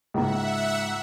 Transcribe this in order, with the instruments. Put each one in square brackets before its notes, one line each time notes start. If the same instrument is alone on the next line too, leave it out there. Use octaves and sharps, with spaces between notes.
[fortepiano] C#2 A#3 [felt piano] G#2 [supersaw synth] E5 F#5